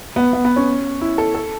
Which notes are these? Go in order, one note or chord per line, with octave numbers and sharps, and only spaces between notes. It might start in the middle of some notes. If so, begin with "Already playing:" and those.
B3
B3
B3
C#4
E4
A4
A4